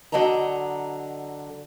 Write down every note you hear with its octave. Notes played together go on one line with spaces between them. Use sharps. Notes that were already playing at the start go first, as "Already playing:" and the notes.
D3 F#3 D#5 A5 A#5